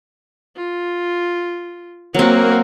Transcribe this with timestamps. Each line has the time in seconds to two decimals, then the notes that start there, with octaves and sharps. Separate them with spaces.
0.56 F4
2.14 F#3 A#3 C4 F#4 A#4